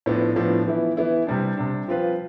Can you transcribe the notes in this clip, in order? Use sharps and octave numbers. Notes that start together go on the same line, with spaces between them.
A2 F3 B3 D4
A2 F3 B3 D4
E3 B3 E4
E3 B3 E4
C3 G3 D4
C3 G3 D4
F3 C4 F4 B4